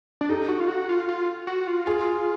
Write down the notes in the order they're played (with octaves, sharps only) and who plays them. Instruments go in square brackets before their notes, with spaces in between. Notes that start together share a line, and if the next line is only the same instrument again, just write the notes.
[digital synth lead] D4
[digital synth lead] D#4 [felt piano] G4 A4
[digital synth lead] F#4
F4
F#4
F4
F4
F#4
F4
[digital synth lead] F4 [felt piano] G#4